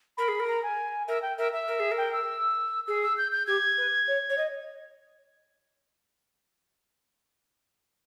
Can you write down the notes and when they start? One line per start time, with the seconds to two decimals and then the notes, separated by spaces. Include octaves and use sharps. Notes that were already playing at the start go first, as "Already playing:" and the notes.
0.17 A#4 B5
0.28 G#4
0.39 A#4
0.48 A#5
0.63 G#5
1.08 A#4 E5
1.22 G5
1.37 A#4 E5
1.52 E5
1.67 A#4
1.79 G#4
1.91 A#4
1.97 G5
2.13 E6
2.87 G#4 E6
3.02 E6
3.18 G6
3.32 G6
3.47 G4 G#6
3.77 B4
4.07 C#5
4.29 C#5
4.37 D#5